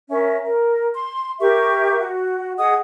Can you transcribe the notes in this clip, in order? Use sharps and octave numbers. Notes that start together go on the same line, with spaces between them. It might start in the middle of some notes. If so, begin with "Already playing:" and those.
C#4 A#4 E5
A#4
C6
G4 A#4 E5 C#6
F#4
G#4 D#5 F#5 D#6